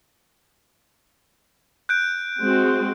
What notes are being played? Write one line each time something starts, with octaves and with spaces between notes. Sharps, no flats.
F#6 G6 D7
G#3 C4 F#4